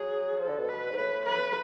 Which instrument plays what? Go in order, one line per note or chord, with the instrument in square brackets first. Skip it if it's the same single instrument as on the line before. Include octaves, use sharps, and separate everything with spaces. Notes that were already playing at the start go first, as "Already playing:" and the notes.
Already playing: [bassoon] F#3 [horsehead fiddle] G#4
[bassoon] F3 [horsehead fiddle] A4
[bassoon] D3
B2
[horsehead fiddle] B4
[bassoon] G#2
[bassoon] A2 [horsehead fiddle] B4
[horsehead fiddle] B4